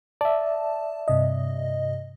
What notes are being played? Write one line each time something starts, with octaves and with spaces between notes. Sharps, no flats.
D5 E5 A5
G2 C3 D#5